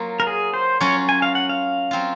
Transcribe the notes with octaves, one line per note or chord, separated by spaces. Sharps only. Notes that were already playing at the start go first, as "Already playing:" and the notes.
Already playing: F#3 A#3 F4
A#4
G#4
C5
F#3 C#4 F4 C#5
G#5
F5
F#5
F5
F#3 C4 F4